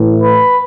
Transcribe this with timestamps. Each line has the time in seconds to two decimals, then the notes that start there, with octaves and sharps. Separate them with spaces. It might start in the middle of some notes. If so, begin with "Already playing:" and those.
Already playing: A2 E3
0.21 B4